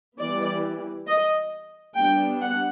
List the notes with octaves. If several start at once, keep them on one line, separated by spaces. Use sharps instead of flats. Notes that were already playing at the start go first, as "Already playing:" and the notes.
E3 G3 B3 D5
D#5
G3 B3 D4 G5
F#5